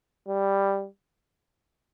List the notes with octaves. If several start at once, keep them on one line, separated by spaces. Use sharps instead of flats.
G3